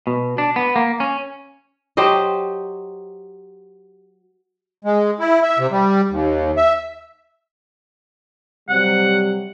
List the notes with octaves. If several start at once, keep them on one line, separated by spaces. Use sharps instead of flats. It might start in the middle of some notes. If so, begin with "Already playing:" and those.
B2
D4
B3
A#3
C#4
F#3 G4 C5 D#5
G#3
E4
E5
C3
G3
D#2
E5
C3 F#3 G3 F#5